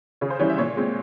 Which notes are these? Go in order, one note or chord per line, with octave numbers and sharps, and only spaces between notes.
C#3 C#5
C5
E3 G3 C#4 C#5
E5
A#2 C#5
G#3 C4